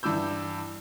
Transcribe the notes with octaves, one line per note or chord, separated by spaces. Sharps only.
G2 E3 D6 E6 G6